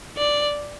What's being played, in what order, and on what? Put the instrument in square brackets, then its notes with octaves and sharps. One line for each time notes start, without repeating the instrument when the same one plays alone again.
[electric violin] D5